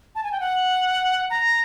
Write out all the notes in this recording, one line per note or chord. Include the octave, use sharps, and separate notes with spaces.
A5
G#5
G5
F#5
A#5